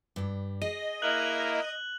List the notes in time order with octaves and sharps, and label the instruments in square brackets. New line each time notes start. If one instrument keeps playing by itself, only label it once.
[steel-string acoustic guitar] G2 G3
[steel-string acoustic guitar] G#4 [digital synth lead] D#5
[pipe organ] A#3 E4 A#4 [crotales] F#6 F#7